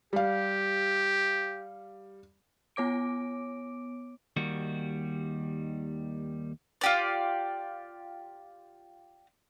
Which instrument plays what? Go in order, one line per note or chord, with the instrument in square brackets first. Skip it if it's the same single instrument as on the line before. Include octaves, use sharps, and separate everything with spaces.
[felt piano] G3 F5 [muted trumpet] G4
[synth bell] B3 C#5 D6 D7
[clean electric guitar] D#2 D#3 G3 F#4
[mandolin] F4 G4 D5